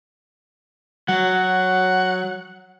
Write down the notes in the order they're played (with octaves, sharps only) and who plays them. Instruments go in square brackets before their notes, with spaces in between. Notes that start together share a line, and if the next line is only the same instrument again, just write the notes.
[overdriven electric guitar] F#3 [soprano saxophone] F#5